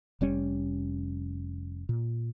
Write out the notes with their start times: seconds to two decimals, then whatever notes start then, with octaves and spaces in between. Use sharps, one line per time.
0.21 F1 G3 C#4
1.89 A#2